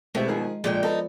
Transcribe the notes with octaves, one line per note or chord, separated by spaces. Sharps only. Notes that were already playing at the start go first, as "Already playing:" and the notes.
B2 G#3 A3 C4 G4 E5
D#3 F3 G#4
A#2 D3 F3 G#3 G5
B3 D#4 A4